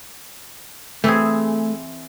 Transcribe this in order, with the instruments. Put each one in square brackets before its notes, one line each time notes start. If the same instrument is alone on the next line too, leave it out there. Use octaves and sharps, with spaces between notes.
[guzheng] E3 C4 G#4 [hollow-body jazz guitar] A3